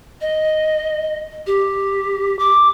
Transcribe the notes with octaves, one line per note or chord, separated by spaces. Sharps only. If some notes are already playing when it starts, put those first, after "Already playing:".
D#5
G4
D6